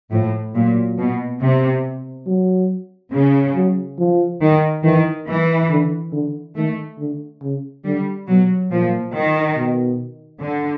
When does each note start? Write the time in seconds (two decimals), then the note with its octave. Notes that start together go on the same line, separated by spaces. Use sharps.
0.11 A2 F3
0.55 A#2 F#3
0.98 B2
1.41 C3
2.27 F#3
3.12 C#3
3.55 F#3
3.99 F3
4.41 D#3
4.84 D#3 E3
5.28 E3
5.71 D3
6.13 D3
6.56 D#3 A3
6.99 D3
7.41 C#3
7.84 D3 G3
8.27 B2 F#3
8.71 A#2 F3
9.14 D#3
9.56 B2
10.42 D3